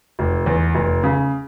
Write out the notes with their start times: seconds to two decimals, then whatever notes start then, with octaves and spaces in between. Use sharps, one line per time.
0.19 F1
0.46 E2
0.75 F1
1.03 C#3